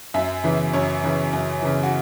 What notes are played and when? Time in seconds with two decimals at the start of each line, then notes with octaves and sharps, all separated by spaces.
0.14 F#2 E5
0.44 C#3 E3
0.73 F#2 C#5
1.04 C#3 E3
1.33 F#2
1.62 C#3 E3
1.83 F#4